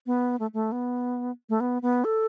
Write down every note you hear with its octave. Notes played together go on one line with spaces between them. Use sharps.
B3
A3
A3
B3
A3
B3
B3
A4